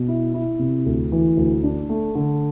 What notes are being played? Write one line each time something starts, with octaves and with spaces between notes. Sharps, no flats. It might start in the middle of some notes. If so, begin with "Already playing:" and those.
Already playing: B2
E4
E4
C3
D2
E3
D2
D4
A3
D3